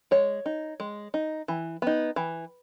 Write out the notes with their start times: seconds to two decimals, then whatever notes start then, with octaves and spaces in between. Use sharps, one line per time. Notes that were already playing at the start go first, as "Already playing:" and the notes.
0.11 G#3 C#5
0.46 D#4
0.80 G#3
1.14 D#4
1.48 E3
1.82 B3 D#4
2.16 E3